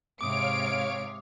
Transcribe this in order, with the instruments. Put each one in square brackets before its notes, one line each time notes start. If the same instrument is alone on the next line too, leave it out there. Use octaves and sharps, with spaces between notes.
[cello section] G#2 C3 [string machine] C#5 F5 [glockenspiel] D6 D#6 [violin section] D7